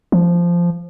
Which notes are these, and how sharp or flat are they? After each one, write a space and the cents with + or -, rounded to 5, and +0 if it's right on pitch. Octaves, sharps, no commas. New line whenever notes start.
F3 -10